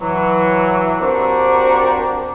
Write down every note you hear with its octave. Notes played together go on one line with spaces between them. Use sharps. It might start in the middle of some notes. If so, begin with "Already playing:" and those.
E3 F#3
A#3 C4 D4 F#4 G4 A#4